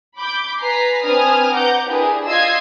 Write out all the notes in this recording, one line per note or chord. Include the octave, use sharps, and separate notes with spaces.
B5 D6 G6
B4 G#5 A#5 B6 C7
C4 D4 B4 G#5 D#6 F6
B4 F#5 A#5 D6 G6
D4 E4 G4 G#4 A#4 B4
F4 D#5 E6 G#6 C7